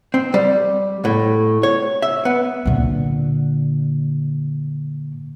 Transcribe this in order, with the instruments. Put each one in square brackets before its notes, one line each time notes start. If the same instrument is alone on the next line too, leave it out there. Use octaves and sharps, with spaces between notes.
[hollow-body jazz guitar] C4
G3
A2
C#5
E5
B3
[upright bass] A#2 D3